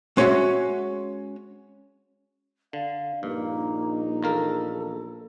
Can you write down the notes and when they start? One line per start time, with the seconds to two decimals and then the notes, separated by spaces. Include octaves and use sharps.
0.17 G#3 C#4 F#4 C#5 E5 F#5
2.73 D3 F5
3.23 A#1 G2 A#3 D#4
4.23 E2 A#3 A4 A#4